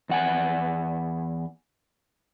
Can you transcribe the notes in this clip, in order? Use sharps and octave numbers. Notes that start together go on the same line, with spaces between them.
E2 F#5 G#5